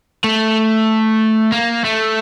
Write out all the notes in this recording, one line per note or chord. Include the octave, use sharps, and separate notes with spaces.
A3
A#3
A3